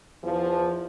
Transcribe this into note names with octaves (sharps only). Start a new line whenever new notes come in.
E2 F3